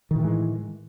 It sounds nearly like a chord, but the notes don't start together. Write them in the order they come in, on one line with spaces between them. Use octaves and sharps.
D#3 A2 E3 G#3